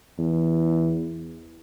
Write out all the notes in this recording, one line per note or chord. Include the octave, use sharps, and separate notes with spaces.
E2